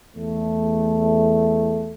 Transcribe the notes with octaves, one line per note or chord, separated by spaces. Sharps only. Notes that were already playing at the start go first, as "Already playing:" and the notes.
E2 A3